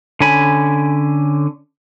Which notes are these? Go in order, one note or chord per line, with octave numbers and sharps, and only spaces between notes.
D3 C#4 G#5 B5